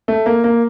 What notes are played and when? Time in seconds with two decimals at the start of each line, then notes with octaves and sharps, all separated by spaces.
0.08 A3
0.26 A#3
0.44 A#3